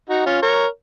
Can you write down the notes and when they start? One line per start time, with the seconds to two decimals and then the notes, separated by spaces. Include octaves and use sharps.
0.09 D#4 F#4
0.26 C#4 F4
0.42 A#4 C#5